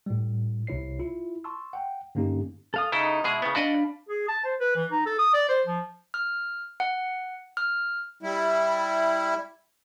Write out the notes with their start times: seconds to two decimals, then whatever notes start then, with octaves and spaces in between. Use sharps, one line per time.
0.06 A2 G3
0.67 C2 C3 E4 C#5 C7
0.99 E4 F4
1.44 A5 C6 C#6 E6
1.73 F#5 G5
2.15 G2 D3 A#3 C#4 D#4 G4
2.74 A4 F5 D#6
2.92 C#3 D#4 E4 A4
3.24 B2 G#3 E4 G#4
3.42 C#3 B3
3.55 D4 F#4 D5 D#5 F5 B5
4.09 G#4
4.28 A5
4.45 C5
4.60 B4
4.76 E3
4.91 D#4
5.06 A4
5.19 D#6
5.34 D5
5.49 C5
5.66 F3
6.14 F6
6.80 F#5
7.57 F6
8.23 G3 E4